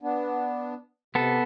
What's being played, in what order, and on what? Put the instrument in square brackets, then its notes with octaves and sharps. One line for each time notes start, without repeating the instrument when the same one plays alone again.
[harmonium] B3 D4
[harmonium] C3 [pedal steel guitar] B3 A4